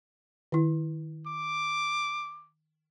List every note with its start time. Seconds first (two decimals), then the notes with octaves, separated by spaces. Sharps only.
0.52 D#3 E4
1.27 D6